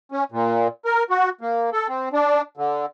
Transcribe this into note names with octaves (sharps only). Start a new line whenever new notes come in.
C#4
A#2
A#4
F#4
A#3
A4
C4
D4
D3